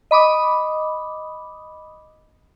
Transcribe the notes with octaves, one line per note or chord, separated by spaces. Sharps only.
D#5 B5 D6 D#6